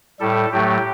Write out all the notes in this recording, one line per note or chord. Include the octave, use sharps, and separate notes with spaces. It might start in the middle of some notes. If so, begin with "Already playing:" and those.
A2 G3 A4
A2 F#3 A3 G4